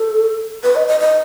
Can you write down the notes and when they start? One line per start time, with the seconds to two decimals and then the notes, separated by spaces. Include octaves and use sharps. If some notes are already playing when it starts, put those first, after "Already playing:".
Already playing: A4
0.63 B4
0.75 D#5
0.88 D#5
1.00 D#5